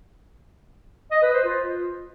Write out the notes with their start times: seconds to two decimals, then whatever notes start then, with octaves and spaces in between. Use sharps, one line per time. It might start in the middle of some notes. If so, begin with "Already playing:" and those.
1.11 D#5
1.23 B4
1.34 C5
1.45 F4